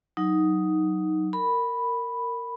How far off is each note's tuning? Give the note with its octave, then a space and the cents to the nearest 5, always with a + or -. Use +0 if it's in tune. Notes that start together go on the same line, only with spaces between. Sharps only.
F#3 +0 D#4 +5
A#4 -20 B5 +0